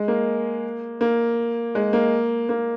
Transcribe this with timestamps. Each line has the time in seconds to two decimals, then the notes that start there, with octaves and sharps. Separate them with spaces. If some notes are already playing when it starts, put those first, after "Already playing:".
Already playing: G#3
0.08 A#3
1.01 A#3
1.75 G#3
1.93 A#3
2.49 A#3